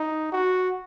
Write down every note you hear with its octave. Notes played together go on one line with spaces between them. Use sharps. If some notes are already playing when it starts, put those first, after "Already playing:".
Already playing: D#4
F#4